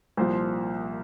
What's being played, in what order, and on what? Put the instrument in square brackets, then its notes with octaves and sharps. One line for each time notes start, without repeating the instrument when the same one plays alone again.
[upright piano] C2 A#2 F3 C5